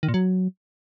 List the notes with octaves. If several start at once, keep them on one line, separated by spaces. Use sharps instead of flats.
D#3
A#2
F#3